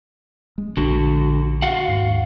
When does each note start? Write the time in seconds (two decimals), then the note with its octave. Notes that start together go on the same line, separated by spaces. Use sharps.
0.58 G#3
0.77 A#1 D3 F#4
1.62 F#4 F5 F#5
1.88 D#2 G#2